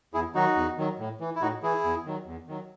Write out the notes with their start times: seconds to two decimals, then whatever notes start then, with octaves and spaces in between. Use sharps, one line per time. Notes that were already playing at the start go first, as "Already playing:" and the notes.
0.14 E2 E4 G#4
0.35 D#3 F#3 D#4 F#4
0.56 E2
0.78 D#3 F#3
0.99 A2
1.20 E3
1.36 E4
1.42 A2 D#4 F#4
1.63 E3 E4 G#4
1.84 E2
2.06 D#3 F#3
2.26 E2
2.48 D#3 F#3